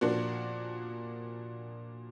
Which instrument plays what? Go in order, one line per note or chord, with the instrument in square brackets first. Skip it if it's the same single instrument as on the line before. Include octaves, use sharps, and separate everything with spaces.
[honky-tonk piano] A#2 F3 A#3 D4 F#4